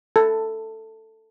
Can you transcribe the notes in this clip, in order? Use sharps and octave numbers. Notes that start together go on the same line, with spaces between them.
A4